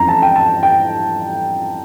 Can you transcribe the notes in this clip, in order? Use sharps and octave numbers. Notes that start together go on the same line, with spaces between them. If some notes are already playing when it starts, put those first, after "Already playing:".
Already playing: F2 E3 A3 C#4 A#5
A5
G5
A5
G5